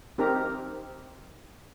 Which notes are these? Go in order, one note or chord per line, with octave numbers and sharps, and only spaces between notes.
C4 D#4 G4 A#4 A#5